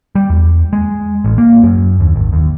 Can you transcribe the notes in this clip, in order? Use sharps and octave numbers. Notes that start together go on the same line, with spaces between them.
G3
E2
G#3
A1
A#3
F#2
D#2
G#1
D#2